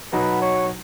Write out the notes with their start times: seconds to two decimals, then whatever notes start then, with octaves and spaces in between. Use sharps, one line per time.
0.13 B2 F#3 B3 D#4 F#4 B4
0.42 C#5